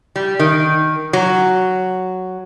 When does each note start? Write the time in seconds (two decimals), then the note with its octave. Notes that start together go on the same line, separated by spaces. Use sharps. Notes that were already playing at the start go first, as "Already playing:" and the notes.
0.16 G3
0.39 D#3
1.13 F#3